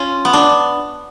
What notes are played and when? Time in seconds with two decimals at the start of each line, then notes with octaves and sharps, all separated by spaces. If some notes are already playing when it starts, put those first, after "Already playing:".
Already playing: C#4 F4
0.25 B3
0.33 D4